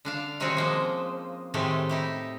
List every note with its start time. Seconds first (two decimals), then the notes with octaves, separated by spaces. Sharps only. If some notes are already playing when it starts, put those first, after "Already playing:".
0.05 D3 D4 F5
0.40 C3 D#3 C4 C#4 D#4 F#4
0.57 F3 G#3 A#3
1.54 A2 C3 D#3 G#3 A3 G4
1.89 D#4 E4 G4